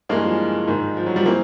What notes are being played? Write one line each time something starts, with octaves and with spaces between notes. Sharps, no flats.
G2 E3 G#3 A#3
F3
G#2 D#3
F3
F#3
F3 G3
E3 A#3 C4